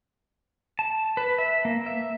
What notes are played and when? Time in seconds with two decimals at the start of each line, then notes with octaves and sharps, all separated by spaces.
0.79 A5
1.17 B4
1.39 E5
1.65 A#3
1.86 E5